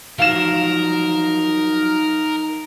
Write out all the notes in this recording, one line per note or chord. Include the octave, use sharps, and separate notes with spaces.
F3 F#3 D#4 A#4 F5 E7